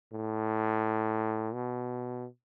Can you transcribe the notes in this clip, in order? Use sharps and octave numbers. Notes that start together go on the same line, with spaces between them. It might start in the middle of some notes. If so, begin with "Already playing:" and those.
A2
B2